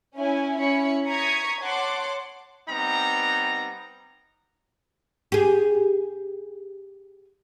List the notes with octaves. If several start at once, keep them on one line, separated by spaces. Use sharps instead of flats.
C#4 E4 G#5
C#4 E4 C#5 B5 C#7
A#5 C#6 D#6 G#6 B6
C#5 F#5 A5 C6 D6
G3 B3 C4 D#4 A#5
G4 G#4